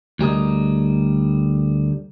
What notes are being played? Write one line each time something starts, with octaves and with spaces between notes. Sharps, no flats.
D2 G3 A#4 D#5